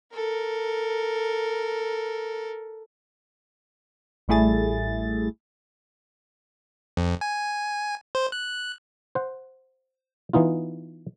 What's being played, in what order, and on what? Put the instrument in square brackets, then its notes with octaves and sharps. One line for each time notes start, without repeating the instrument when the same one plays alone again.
[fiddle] A4 A#4
[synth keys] A1 G3 A3 E4 G#4 A6
[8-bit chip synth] F2
G#5
C5
F#6
[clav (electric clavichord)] C5 F#5
E3 B3 D#4 F4